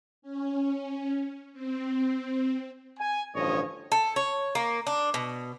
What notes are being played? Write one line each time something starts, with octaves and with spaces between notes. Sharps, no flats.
C#4
C4
G#5
A1 G2 D3 F3 C#5 D#5
A4
C#5
A#3
D4
B2